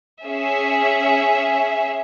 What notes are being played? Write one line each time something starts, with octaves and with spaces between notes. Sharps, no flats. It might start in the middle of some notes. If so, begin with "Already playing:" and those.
C#4 G#4 E5